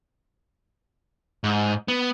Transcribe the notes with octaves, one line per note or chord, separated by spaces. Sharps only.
G#2
B3